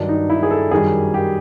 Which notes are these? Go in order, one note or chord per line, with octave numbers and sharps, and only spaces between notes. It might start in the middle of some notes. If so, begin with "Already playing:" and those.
Already playing: G2 D#3 F#3 D4
D#4
E4
G#4
A4
F#2 D#3 G3 G#4
G4